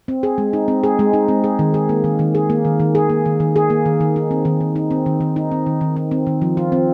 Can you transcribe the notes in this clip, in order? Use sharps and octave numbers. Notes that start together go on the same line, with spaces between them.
C4
G#4
G#3
D#4
C4
G#4
G#3
D#4
C4
G#4
D#3
G#4
A#3
D#3
D#3
G#4
A#3
D#3
D#3
G#4
A#3
D#3
D#3
G#4
A#3
D#3
D#3
D#4
C4
D#3
D#3
D#4
C4
D#3
D#3
D#4
C4
D#3
D#3
D#4
C4
D#3
F3
F4
C4